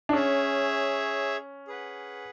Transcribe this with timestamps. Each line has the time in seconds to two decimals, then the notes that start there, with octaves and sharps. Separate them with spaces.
0.09 D4
0.13 C#4 G#4 C#5 E5
1.67 G#4 B4 F#5